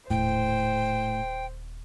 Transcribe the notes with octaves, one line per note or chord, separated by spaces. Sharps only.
D#1 A2 D3 C5 G5